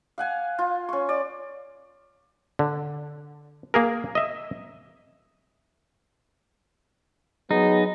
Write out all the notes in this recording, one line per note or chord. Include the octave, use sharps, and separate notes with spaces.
F5 F#5 G#5
F4
C#4 C#6
D5
D3
A#3 G#4 A#4
D#5 E5
F#3 B3 D#4 G#4